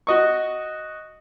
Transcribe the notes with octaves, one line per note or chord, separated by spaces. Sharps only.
F#4 D#5 C#6